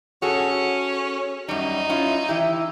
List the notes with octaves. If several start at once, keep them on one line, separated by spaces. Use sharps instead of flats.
C#4 F#4 G#4 A4
F#2 G3 D#4
C#4 E4 F4
E3 E4 G4